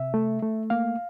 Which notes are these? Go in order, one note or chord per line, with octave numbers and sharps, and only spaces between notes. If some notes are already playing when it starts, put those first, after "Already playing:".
Already playing: C3 E5
A3
A3
A#3 F5